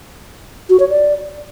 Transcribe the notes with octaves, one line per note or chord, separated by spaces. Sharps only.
F#4
C#5
D5